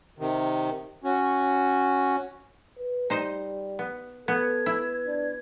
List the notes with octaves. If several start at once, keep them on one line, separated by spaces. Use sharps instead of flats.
C3 D#3
C#4 F#4
B4
G3 D#4 C5 D#5
B3
B3 A4 B4 G#6
E4
D4